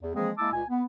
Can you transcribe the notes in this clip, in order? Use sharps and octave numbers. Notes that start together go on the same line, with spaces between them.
E2
E3 F3 G#3 A#3 C4 G#4
G#3 A#3 E4 A5 D6 E6
C#2 A#2 G#5
B3